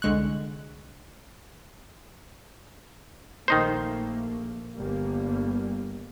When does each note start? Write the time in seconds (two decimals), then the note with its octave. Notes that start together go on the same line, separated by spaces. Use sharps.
0.02 C2 D3 G#3 C#6 F#6
3.48 A#1 D#3 A3 A#3 D#4 C5
4.75 G1 G3 A#3